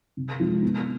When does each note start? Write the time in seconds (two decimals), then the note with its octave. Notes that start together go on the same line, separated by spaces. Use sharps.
0.17 C3
0.40 F3 G#3 C4 F4
0.62 B3